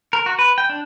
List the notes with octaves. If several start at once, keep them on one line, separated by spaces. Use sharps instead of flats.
A#4
F#4
B4
G5
D4